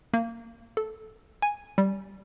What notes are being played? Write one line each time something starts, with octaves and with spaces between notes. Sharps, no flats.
A#3
A4
G#5
G3